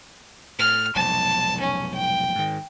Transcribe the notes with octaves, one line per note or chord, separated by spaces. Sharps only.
A2 F6
F1 B1 G#2 A5
C#4
G5
G#2 D#3